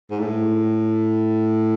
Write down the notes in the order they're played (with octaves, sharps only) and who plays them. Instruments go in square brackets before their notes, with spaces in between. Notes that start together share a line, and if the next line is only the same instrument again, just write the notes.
[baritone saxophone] G#2
A2